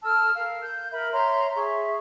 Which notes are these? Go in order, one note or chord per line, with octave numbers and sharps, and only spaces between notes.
A4 A5 E6 F6
A#4 F5
G6
A#4 E5 B5
C#5 E5 A#5 C6
G#4 E5 C#6